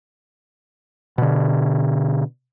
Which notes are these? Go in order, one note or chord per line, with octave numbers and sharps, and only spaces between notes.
B2 D3